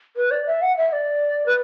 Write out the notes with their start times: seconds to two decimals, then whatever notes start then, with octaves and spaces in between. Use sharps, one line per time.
0.16 B4
0.31 D5
0.47 E5
0.62 F#5
0.77 E5
0.93 D5
1.46 B4